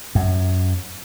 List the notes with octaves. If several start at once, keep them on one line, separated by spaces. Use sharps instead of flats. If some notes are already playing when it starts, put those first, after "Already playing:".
F#2